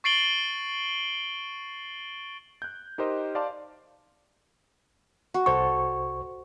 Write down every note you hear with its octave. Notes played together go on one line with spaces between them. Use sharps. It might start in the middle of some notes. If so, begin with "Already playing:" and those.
C#6 A6 C7 D7 F#7 G7
F#6 G6
D#4 G4 A#4 C5 D#5
D5 F5 A5 C6 D6
F#4
C2 A4 C5 C#6